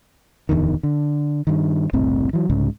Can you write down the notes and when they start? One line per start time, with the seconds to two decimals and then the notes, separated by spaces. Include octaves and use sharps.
0.49 D1 E2 D3 D#3
0.83 D3
1.47 G2 D#3
1.93 F#1 C2 A2 C4
2.33 E3 F#3
2.50 C2 G#2 C#3